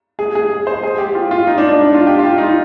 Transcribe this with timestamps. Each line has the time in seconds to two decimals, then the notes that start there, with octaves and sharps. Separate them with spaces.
0.19 G#4
0.35 G#4
0.67 C5
0.83 G#4
0.98 G4
1.15 F4
1.31 F4
1.47 D#4
1.58 D4
1.68 D4
1.79 D#4
1.94 F4
2.07 G4
2.19 F4
2.38 D#4
2.44 F4